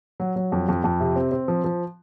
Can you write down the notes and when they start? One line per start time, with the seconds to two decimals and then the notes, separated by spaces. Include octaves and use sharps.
0.20 F#3
0.36 F#3
0.52 F2
0.69 F2
0.84 F2
1.00 C3
1.16 C4
1.32 C4
1.48 F3
1.64 F3